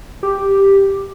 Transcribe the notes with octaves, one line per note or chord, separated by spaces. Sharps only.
G4